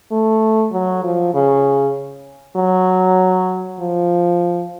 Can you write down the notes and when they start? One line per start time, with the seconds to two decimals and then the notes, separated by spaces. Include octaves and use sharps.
0.11 A3
0.72 F#3
1.03 F3
1.34 C#3
2.57 F#3
3.80 F3